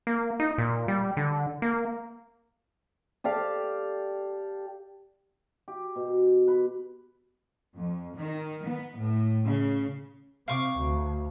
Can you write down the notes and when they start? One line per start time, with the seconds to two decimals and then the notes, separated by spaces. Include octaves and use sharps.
0.07 A#3
0.40 D#4
0.58 A#2
0.88 G3
1.17 D3
1.62 A#3
3.24 G4 A4 D5 F5
5.68 G4
5.96 B2
6.48 B4
7.76 F2
8.17 D#3
8.66 B3
8.98 A2
9.44 C#3
10.48 C3 F5 C#6 D6
10.77 D2